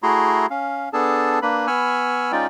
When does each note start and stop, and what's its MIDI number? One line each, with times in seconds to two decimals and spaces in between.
0.03 0.46 57
0.03 0.46 64
0.03 0.46 66
0.03 0.46 68
0.03 0.46 82
0.03 0.46 84
0.50 0.89 61
0.50 0.89 77
0.93 1.39 59
0.93 1.39 62
0.93 1.39 68
0.93 1.39 69
0.93 1.39 81
1.42 1.67 58
1.42 1.67 62
1.42 1.67 71
1.42 1.67 83
1.67 2.32 59
1.67 2.32 80
1.67 2.32 83
1.67 2.32 85
1.67 2.32 88
1.67 2.32 89
2.32 2.47 56
2.32 2.47 61
2.32 2.47 63
2.32 2.47 65
2.32 2.47 74
2.32 2.47 79